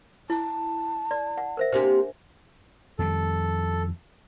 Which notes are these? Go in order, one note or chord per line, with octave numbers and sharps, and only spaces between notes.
E4 A5
D5
F#5
A#4 C5 E5
C3 A#3 D4 G4 C5
F2 D#3 G3 A4